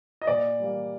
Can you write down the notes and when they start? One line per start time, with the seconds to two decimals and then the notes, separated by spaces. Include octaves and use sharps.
0.22 D#5
0.27 A#2 D5
0.60 G3 A#3